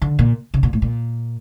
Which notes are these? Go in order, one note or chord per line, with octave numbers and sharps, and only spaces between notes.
D3
A#2
C#3
A#2
A2
A#2